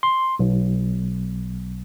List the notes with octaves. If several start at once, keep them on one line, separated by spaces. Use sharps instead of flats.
C6
B1